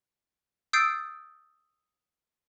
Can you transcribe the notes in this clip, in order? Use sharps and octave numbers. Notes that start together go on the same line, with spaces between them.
D#6 E6 G6 A6 C7 D7